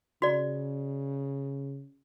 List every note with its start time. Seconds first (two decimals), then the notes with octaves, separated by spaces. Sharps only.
0.22 C#3 F#4 D5